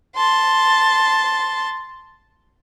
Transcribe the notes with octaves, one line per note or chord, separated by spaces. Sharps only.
A5 C6